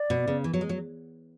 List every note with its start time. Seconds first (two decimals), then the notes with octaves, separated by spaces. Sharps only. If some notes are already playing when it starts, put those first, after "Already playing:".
Already playing: D5
0.10 B2
0.28 C#3
0.44 E3
0.53 F#3
0.61 G#3
0.69 F#3